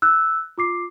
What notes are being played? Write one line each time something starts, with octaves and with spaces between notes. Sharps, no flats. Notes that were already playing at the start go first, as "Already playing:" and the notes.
E6 F#6
F4 D6 C7